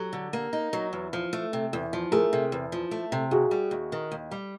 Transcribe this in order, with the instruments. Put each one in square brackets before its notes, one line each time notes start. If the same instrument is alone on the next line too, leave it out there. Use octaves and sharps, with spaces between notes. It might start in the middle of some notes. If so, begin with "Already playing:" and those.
Already playing: [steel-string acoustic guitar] F#3 [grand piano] G4 A4
[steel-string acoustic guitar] D3
A#3
D#4
F#3
E2
F3
A3
C3
E2
F3
[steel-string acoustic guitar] A3 [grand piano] G#4 A#4
[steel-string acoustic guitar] C3
E2
F3
A3
C3
[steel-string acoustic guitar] D#2 [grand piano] F#4 G#4
[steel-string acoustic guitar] G3
D#2
D#3
D#2
G3